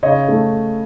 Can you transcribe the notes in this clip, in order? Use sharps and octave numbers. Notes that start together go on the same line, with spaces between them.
C#3 C#5 D#5
A3